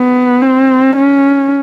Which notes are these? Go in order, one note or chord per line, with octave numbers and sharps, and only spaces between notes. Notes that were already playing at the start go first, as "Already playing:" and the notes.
Already playing: B3
C4
C#4